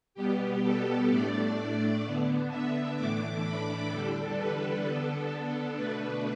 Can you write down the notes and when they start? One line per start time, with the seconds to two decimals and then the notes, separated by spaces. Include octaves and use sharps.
0.14 B2 G3 B3 G4
0.62 A4
1.08 A2 A3 D4 D5
2.02 D3 B3 D4
2.49 E5
2.96 A2 E3 A3 D4 D6
3.42 B5
3.88 E2 D3 G3 D4 A4
4.35 B4
4.82 D3 B3 D4 A4
5.30 A4
5.76 B2 A3 D4 B4